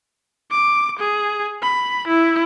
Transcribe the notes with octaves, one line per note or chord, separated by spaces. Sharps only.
D6
G#4
B5
E4